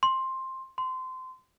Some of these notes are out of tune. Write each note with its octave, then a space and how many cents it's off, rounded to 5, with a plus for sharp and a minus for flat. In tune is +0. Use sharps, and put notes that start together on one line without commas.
C6 +10
C6 -25